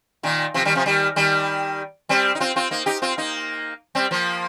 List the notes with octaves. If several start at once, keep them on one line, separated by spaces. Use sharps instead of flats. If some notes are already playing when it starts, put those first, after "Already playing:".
A#2 D#3
C3 F3
D#3 G3
C3 F3
D#3 G3
D#3 G3
G3 C4
D#4
C4 F4
C4 F4
A#3 D#4
D#4 G4
C4 F4
A#3 D#4
G3 C4
F3 A#3